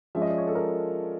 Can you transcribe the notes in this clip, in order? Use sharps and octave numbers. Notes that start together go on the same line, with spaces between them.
F3 G#3 C#4 E5
D#5
D5
C#5
A4
A#4